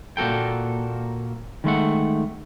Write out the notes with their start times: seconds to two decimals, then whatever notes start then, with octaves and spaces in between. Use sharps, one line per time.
0.17 A#2 A#3 F#4 A4 G5
1.64 D#3 G#3 A3 F#5